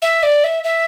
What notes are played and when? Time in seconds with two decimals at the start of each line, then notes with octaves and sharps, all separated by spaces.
0.02 E5
0.23 D5
0.44 E5
0.64 E5